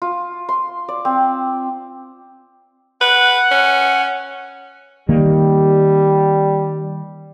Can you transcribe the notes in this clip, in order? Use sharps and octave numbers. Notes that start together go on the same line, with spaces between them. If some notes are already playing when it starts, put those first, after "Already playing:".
F4
C6
D5
C4
B4 F#5
C#4
D#3 G3 A#3